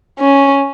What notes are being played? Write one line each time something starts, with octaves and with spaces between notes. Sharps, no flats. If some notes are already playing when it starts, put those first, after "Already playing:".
C#4